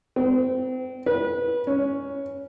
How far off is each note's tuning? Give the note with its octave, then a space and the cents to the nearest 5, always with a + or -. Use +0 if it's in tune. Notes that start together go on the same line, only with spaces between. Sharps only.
C4 -30
B4 -25
C#4 +5